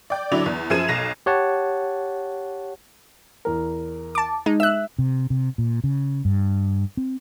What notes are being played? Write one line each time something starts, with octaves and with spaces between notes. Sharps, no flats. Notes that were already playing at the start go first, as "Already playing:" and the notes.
D5 G5
D3 F#3 E4 D5 F7
E2
F#2 F3 G#4 G#6 D#7 E7
B1 A#6 E7 F7
G4 C#5 F#5 A5
E2 A#4
A5 D6
G#3 D#4
E5 E6 F#6
C3
C3
A#2
C#3
G2
C4